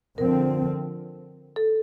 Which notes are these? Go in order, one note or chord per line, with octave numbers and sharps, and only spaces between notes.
D3 F3 C4 A#4
A4